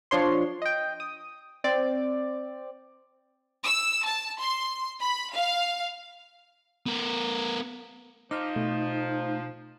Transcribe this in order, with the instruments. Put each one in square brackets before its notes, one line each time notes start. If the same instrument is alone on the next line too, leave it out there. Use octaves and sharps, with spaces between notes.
[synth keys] F3 D4 C#5 C6
D#5 G5
D#6
C4 D5
[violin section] E6
A5
C6
B5
F5
[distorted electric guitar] B3 A#4
[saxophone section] F3 [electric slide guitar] D#4 [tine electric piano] D6 F6
[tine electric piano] B2 [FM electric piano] A3